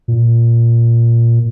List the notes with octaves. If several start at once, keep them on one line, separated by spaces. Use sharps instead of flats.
A#2